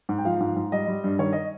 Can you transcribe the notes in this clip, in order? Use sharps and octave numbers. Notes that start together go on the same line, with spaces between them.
G#2
G5
F3 F5
G#2
G#2
G3 D#5
G3
G2
D#3 C#5
D#5